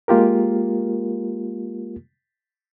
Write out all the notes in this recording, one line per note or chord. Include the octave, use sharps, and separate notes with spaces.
G#3 A#3 F4 G4 A#4